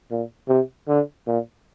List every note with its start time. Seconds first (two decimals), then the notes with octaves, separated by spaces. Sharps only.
0.11 A#2
0.48 C3
0.88 D3
1.27 A#2